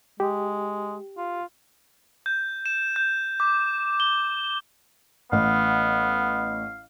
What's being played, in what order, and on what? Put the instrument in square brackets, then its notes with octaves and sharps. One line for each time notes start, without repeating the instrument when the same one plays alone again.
[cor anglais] G#3 [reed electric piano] G4
[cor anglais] F4
[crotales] G6
E7
G6
D6
G7
[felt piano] A1 [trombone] B3 [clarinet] F5